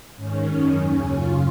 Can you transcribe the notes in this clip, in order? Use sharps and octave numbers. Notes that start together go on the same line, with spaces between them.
G#2 D#3 C#4
F#2 D#3
D#2 C#3
F#2 C#3 F4